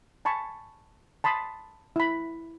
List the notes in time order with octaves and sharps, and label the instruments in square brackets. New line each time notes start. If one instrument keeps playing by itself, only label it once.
[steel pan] G#5 A5 B5 C#6
A5 B5 C6 D#6
E4 B5